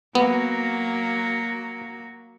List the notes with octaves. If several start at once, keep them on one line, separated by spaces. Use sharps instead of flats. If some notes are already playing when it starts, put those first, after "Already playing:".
F#3 A#3 B3 F#4